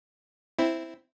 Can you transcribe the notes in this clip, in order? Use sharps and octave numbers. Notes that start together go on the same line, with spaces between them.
C4 E4